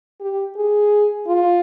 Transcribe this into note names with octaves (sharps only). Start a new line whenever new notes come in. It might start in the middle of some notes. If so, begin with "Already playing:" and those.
G4
G#4
F4